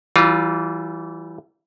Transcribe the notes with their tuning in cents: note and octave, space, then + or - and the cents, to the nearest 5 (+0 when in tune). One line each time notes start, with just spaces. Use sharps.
E3 +0 G3 -35 F4 +10